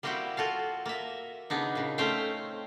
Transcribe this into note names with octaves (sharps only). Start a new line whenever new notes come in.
G3 A#3 C4 E4 F#4 G4
F4 F#4 A4 F5
A#3 E5
C#3 B3 D4 D#4
A#2 C#3
A3 C4 C#4 C5 F5 G5